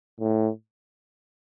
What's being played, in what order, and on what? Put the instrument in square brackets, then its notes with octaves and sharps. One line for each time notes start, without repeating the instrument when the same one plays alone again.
[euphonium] A2